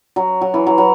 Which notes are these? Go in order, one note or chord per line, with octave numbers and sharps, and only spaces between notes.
F#3
F#3
E3
F#3
F#3